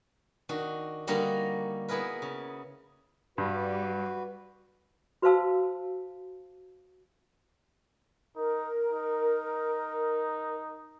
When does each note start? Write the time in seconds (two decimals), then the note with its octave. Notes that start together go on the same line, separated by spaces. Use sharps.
0.49 D#3 D4 F#4
1.07 D3 G3 A#3 D#4 F#4 A#4
1.88 B3 E4 G#4 A#4 B4
2.22 C#3
3.38 G2 G3 F#4 B4 D5
5.22 F#4 B4 C5 F5 A5 E6
8.36 D#4 A#4
8.90 D#4